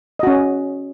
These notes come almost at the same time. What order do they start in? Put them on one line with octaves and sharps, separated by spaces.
D#5 F#4 C#4